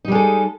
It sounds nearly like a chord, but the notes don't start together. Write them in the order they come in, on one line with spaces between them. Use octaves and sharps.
D#4 G3 G#3 A4